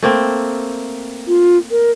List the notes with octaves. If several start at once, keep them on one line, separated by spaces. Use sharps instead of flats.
A3 A#3 C4
F4
A#4